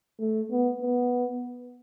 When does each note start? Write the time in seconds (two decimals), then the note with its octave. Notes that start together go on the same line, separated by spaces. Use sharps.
0.20 A3
0.51 B3
0.82 B3